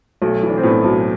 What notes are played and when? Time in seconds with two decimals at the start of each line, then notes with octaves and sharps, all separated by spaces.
0.22 B1 A3
0.43 E3
0.49 D4
0.57 C4
0.63 A2 B3
0.84 B1